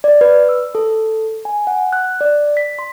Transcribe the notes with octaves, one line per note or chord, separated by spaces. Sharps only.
D5
B4
E6
A4
G#5
F#5
F#6
D5
B6
C6